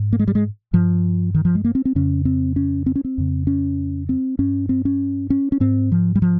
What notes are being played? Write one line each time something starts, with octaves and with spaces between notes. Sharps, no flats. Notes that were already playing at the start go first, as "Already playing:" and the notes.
Already playing: G#2
A#3
G#3
G3
G#3
G2 F3
D#3
F3
G#3
A#3
C4
C4
F2 C#3 C#4
C4
C#4
C4
C#4
C4
F2 C#3
C#4
C4
G2 C#4
C4
C#4
C#4
C#4
G#2 C4
F3
G3
F3